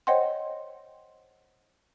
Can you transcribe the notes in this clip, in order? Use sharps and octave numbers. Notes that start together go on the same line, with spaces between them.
C5 C#5 D#5 F#5 G5 C6